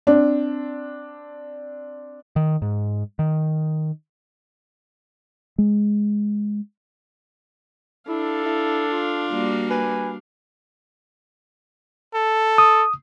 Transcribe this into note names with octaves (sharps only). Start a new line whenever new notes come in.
C4 D4
D#3
G#2
D#3
G#3
D4 E4 A4 F5
E4
F4
G3 A#3 F#4
B4 G#5
A4
D#6